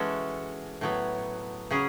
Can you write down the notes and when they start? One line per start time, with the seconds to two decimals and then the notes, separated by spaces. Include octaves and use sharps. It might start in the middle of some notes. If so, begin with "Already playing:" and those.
Already playing: E3 G#3 C#4 F#4 A4
0.81 A2 F#3 B3
1.71 C#3 F#3 C#4 G#4